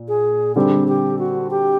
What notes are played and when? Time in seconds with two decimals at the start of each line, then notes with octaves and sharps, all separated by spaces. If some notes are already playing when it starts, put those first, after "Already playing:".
Already playing: A#2
0.08 G#4
0.55 D3 G3 C4 G4
0.88 G4
1.19 F#4
1.51 G4